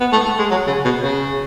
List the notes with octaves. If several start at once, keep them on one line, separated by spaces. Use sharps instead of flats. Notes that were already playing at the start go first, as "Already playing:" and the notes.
B3
A3
A3
G#3
F#3
C#3
B2
C#3